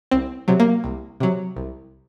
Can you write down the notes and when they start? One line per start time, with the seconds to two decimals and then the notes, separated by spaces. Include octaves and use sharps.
0.11 C2 C4
0.48 C3 F#3
0.60 A#3
0.84 C2
1.20 C3 F#3
1.57 C2